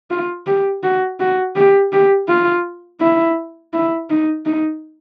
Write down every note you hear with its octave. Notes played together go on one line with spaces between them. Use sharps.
F4
G4
F#4
F#4
G4
G4
F4
E4
E4
D#4
D#4